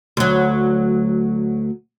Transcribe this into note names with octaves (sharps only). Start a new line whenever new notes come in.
D2 F#3